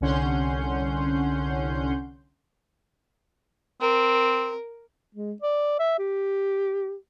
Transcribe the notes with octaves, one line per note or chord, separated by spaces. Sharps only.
C2 D3 C#4 F#5 C6 G6
C4 A#4
G#3
D5
E5
G4